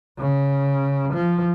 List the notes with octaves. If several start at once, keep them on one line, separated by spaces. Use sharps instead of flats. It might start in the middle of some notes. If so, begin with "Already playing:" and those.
C#3
F3